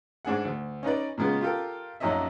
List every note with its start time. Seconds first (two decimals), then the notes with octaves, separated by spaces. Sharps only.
0.25 G#2 D4 G#4 F#5
0.45 D2
0.83 C#4 D#4 B4 D5
1.18 A#2 C#3 G#3 B3
1.41 F4 G4 A4 A#4
2.00 A#1 F#2 C#4 D#4 D#5 E5